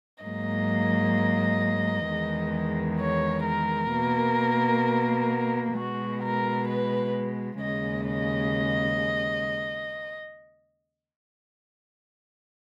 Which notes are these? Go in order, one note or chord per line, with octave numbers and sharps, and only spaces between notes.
G#2 F#3 A#3 D#5
E2 D#3 G#3
C#5
A#4
B2 A#3
B2 G#3 F#4
A#4
B4
D#2 C#3 G#3 D#5
D#5